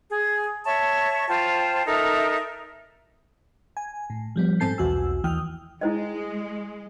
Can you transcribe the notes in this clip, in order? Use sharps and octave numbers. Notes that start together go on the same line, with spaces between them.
G#4
C#5 E5 A5 C#6
F4 C5 G5 A5
D#4 A4 A#4 E5
G#5
A2
F3 G3 B3
G#2 C4 A4 A5 G6 C7
B1 E2 F#4 G#5 E6
D#2 E3 G5 D#6 F6
G#3 E4 C5 D#5